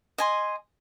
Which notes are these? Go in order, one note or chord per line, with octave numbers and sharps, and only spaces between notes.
D#5 G#5 C6